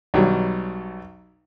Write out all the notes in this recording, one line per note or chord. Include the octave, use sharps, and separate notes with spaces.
B1 F#3 G3